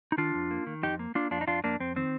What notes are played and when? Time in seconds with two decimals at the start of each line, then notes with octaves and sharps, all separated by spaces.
0.12 D#4
0.17 D#3 D4 F4
0.35 F2
0.51 A#3
0.67 D#3
0.83 F2 D#4 G4
0.99 A#3
1.15 A#3 D4 F4
1.31 F2 D4 F4
1.41 D#4
1.47 F2 D4 F4
1.64 F2 A#3 D4
1.80 F2 C4
1.96 D#3 C4